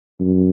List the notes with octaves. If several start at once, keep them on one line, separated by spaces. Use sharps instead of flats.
F#2